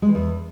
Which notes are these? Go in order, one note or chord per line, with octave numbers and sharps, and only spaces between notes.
G#3
E3
E2